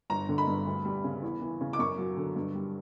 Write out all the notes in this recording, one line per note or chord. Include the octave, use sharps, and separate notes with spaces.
G1 A#5
D3
B5
G2
D2
G3
C#3
E2
E3
C#3
D6
F#2 C#6
F#3
D3
G2
G3